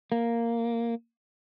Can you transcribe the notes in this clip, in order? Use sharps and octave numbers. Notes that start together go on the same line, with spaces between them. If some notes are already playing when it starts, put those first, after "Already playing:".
A#3